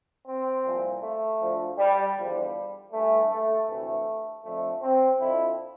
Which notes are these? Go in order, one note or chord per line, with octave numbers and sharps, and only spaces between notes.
C4
C2 A#2 F3
A3
D2 D3 F3
G3
E2 D3 F3 G3
G2 E3 A3
A3
D2 C3 E3 A3
F2 D3 F3 A3
C4
F2 D3 F3 E4